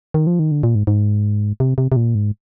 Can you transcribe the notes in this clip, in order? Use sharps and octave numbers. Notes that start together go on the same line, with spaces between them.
D#3
F3
D#3
D3
A#2
G#2
G#2
C3
C3
C3
A#2
G#2